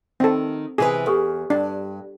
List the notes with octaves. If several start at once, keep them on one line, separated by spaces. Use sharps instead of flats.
D#3 C4 A4
C3 E3 G#4 B4
E2 G4 A4 B4
G2 D4